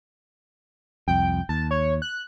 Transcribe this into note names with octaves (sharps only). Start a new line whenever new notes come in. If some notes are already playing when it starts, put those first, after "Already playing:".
C2 F2 G5
D#2 A5
C#5
F#6